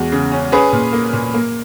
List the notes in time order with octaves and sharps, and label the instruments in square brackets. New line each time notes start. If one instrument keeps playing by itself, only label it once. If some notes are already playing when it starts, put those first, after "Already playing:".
Already playing: [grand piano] E2 G#3 F#4
C#3
C#4
C#4 G#4 B4
A#2
A#3
A#2
A#3